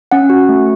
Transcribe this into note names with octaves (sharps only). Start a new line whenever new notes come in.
C#4 F#5
F#4
A3